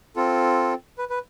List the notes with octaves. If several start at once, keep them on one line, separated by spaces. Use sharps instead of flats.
C4 F4 A4
B4
B4